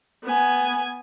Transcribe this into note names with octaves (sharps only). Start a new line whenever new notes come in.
B3 G#5